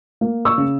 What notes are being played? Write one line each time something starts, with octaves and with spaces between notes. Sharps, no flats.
A#3
C#6 E6
C#3